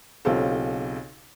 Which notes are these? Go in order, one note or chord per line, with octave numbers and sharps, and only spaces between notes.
B1 C#3 C4 F4 G4 A4